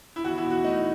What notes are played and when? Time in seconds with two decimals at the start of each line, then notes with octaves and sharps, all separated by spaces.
0.16 E4
0.24 E2 F#4
0.38 E4
0.45 B2
0.50 F#4
0.64 A3 D#4